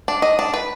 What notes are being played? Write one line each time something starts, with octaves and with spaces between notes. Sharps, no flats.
D4
D#5
D4
B4